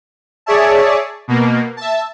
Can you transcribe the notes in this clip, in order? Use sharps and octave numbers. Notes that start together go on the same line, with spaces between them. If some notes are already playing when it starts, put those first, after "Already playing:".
G#4 C#5 D5 E5 A5
B2 A#3
E5 A5